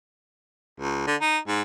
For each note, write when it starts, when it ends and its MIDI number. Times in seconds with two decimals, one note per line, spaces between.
0.80 1.06 37
1.07 1.16 50
1.21 1.38 63
1.48 1.62 44